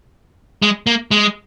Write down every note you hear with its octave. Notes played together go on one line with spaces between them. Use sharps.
G#3
A#3
G#3